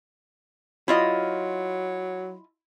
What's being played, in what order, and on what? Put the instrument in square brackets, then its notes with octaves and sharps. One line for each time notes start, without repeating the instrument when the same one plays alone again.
[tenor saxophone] F#3 [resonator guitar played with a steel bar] E4 F4 D#5